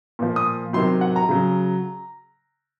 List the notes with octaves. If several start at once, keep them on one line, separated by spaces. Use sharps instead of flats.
A#2 F3
D#6
C3 D#3 F#3 C6
F#5
A#5
C#3 F#3